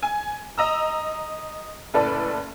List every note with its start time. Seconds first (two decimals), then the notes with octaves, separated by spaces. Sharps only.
0.03 G#5
0.58 D#5 A#5 E6
1.94 F#1 A2 A4 B4 D5